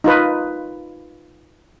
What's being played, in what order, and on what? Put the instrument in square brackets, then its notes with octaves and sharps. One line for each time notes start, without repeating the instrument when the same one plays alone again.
[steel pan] D#4 F4 B4